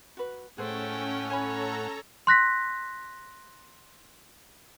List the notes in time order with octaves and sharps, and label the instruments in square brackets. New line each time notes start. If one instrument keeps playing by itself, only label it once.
[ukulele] F#4 B4
[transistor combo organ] A2 F#5 [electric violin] A3 G5 [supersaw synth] C#4 [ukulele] G#4 C5
[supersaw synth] A4 A#5 [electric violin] C#5 [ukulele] G#5 B5
[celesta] C6 F#6 A#6 B6